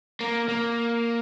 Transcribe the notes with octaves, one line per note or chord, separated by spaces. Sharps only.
A#3
A#3